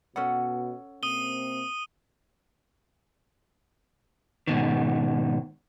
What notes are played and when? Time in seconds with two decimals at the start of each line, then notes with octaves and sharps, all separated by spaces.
0.16 B2 C#4 A4 F#5
1.03 C3 A#3 C4 D#6 D#7 G7
4.47 G#2 B2 D#3